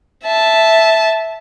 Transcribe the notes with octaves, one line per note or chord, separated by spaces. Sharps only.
E5 A5